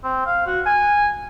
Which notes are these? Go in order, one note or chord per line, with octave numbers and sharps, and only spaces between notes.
C4
F5
F#4
G#5